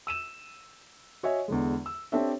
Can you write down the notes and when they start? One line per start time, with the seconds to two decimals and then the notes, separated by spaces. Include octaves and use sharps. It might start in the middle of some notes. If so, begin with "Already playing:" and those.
0.07 E6 D#7 E7
1.23 F#4 C#5 D#5 E5 G#5
1.48 E2 D3 G#3
1.86 E6
2.12 C4 D4 G4 A4 C#5 E5